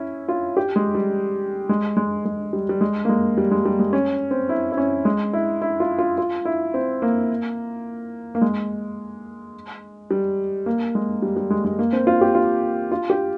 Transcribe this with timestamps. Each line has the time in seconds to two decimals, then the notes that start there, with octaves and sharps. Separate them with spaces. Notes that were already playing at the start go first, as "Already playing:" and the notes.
Already playing: C#4 E4
0.29 F4
0.57 G4
0.76 G#3
0.95 G3
1.69 G#3
1.97 G#3
2.25 G#3
2.53 G3
2.69 G3
2.81 G#3
3.05 A#3
3.09 G#3
3.38 G3
3.51 G#3
3.66 G3
3.79 G#3
3.93 C#4
4.31 C4
4.49 E4
4.72 E4
4.77 C#4
5.05 G#3
5.33 E4
5.62 E4
5.80 F4
5.99 F4
6.18 F4
6.45 E4
6.74 C4
7.02 A#3
8.35 A#3
8.42 G#3
10.11 G3
10.66 A#3
10.95 G#3
11.22 G3
11.37 G3
11.50 G#3
11.65 G#3
11.79 A#3
11.93 C4
12.07 F4
12.21 G4
12.35 F4
12.92 F4
13.10 G4